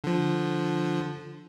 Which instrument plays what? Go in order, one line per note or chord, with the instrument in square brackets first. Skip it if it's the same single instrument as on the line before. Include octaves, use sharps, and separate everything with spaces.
[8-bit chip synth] D3 F3